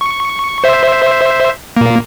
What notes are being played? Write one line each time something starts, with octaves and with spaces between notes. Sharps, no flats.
C#6
C5 E5
A#2 A#3